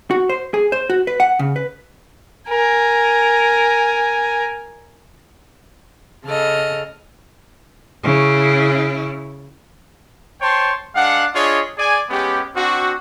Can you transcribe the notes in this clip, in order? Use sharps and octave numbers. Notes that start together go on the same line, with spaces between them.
F#4
C5
G#4
C5
F#4
B4
F#5
C#3
B4
A#4 G#5
C#3 A4 D#5 F6
C#3 E4
C5 C#5 G5 A5 C6
G#3 D4 F5 F#5
D4 F4 G#4 C#5 D#5
G#4 D5 G#5
G#3 B3 C#4 G4
C4 D4 F#4